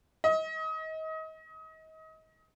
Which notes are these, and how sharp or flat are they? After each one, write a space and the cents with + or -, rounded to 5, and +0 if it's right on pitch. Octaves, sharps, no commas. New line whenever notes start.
D#5 +30